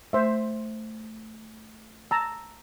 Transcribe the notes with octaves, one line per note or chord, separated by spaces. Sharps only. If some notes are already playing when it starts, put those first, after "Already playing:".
A3 C5 E5
A5 A#5 E6